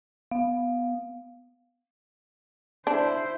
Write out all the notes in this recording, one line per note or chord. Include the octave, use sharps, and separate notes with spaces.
B3 F5
D4 E4 C5